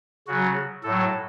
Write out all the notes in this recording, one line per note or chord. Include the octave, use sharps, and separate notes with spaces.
C#3 F#3 F#4
A2 F#3 A4